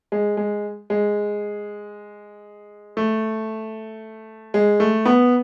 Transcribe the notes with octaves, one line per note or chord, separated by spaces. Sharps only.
G#3
G#3
G#3
A3
G#3
A3
B3